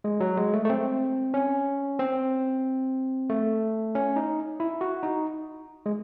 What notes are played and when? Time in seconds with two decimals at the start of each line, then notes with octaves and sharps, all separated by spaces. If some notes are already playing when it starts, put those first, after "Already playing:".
0.04 G#3
0.20 F#3
0.37 G#3
0.54 A3
0.65 A3
0.70 C4
1.34 C#4
1.99 C4
3.30 A3
3.95 C#4
4.16 D#4
4.60 E4
4.81 F#4
5.03 D#4
5.86 G#3